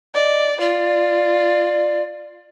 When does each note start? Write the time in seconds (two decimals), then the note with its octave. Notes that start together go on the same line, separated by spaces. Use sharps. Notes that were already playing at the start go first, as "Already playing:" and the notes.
0.14 D5 D#5
0.61 F4 D5